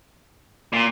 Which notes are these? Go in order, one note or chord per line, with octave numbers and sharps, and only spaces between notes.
A#2